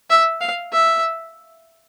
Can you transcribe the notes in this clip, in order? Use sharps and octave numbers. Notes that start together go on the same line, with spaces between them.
E5
F5
E5